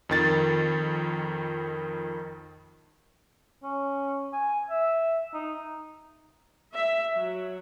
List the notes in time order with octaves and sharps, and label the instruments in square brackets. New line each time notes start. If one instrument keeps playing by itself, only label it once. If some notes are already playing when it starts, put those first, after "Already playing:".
[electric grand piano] F2 D#3 A6
[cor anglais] C#4
G#5
E5
D#4
[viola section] E5
F#3